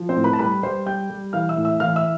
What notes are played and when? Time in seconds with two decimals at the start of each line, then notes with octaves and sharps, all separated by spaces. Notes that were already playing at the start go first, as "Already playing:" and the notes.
Already playing: F3
0.09 C4 C5
0.16 A2
0.24 B4 B5
0.33 A5
0.39 G3 B4 B5
0.63 G3 C5 C6
0.86 G3 G5 G6
1.10 G3
1.33 E3 F5 F6
1.49 E5 E6
1.57 A2
1.65 E5 E6
1.80 E3 F5 F6
1.96 E5 E6